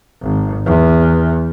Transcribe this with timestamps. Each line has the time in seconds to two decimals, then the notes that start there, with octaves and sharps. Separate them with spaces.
0.21 G#1
0.65 E2